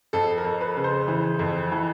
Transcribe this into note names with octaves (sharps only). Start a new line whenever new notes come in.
F2 A4
A#4
F2
B4
C#3
C5
E3
F2
E3